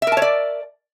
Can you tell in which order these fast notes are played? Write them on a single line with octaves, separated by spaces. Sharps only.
E5 A#4 A5 C#5 D5